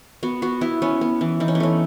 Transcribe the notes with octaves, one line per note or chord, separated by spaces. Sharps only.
B3 F#4
B3 F#4
B3 E4
B3 C#4
B3
E3
E3 D#4
C#4
B3
A3 C#4